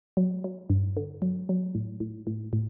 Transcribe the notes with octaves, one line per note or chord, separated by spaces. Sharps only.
F#3
F#3
G2
D3
F#3
F#3
A2
A2
A2
A2